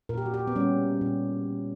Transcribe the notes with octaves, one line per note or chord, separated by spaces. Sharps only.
A#2 A#4
G4
F#4
G4
B3
G3 A#3 C#4
A#2 C#4